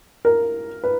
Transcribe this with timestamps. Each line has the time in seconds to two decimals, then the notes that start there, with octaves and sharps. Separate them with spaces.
0.25 A#4
0.84 B4